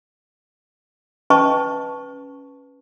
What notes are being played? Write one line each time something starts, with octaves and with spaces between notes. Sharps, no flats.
C#4 B4 D#5 A5 C#6